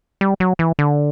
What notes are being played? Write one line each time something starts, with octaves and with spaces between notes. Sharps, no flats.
G3
F#3
E3
D3